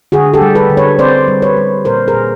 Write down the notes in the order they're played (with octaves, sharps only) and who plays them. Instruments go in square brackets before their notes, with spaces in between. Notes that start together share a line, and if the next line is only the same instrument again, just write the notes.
[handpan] D3 F#4 G#4
G4 A4
G3
A4 B4
D3
B4 C#5
C4 C5 D5
G3
B4 C#5
G3
A#2 A#4 C5
G#4 A#4
A#2